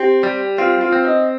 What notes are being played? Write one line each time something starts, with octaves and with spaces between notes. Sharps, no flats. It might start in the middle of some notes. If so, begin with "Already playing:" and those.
Already playing: C4 G4
G3
C4 F4
F4
C4
D#4